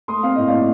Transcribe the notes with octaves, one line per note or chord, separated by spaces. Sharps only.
A3 C6 D#6
C4 F5
A2 D#5
D5 F5
A2